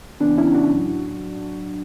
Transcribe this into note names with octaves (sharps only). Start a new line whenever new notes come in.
C#3 E3 B3 D4
C#4 E4
D4 F#4
A2 F#3